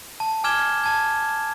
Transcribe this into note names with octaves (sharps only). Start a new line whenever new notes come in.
A5
G#5 D6 F6 G#6 E7 G7
A5 G#6